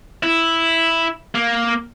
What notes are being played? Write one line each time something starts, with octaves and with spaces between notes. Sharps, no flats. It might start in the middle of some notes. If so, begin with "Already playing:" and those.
E4
A#3